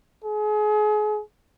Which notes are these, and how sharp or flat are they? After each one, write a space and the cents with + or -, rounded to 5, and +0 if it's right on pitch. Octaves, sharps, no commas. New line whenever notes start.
G#4 +35